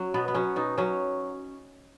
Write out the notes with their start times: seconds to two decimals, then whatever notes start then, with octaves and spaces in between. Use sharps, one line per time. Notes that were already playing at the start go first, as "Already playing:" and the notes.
Already playing: F#3 C#4
0.14 B2 B3
0.28 B3
0.35 F#3 C#4
0.56 B2 D#4
0.78 F#3 C#4